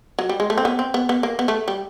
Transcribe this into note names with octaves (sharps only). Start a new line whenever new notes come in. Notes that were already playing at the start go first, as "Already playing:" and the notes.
F#3
G3
G#3
A3
C4
B3
C4
B3
B3
A#3
B3
A3
G3